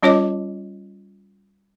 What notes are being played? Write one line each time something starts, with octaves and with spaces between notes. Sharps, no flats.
G3 C#4 F4 C#5 D#5 D6